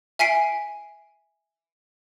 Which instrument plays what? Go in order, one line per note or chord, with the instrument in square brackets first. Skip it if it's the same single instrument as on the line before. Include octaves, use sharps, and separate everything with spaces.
[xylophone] E5 G#5 B6 C7 D7